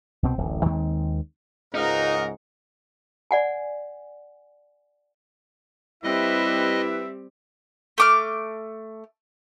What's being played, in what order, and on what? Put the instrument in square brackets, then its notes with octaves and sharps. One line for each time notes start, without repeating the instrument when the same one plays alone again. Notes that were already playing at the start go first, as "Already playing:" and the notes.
[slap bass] C2 B2 C4
D1 A1
D#2 D#3 G#3 C4
[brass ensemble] C#2 G#2 [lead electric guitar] D#4 [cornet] A#4 [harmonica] D#5 F5 F#5
[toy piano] D5 F#5 G#5
[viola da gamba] G3 C4 G4 [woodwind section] E4 B4 [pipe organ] D#5 [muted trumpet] E5
[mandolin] A3 D6 F6